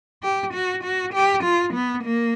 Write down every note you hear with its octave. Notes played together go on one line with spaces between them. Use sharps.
G4
F#4
F#4
G4
F4
B3
A#3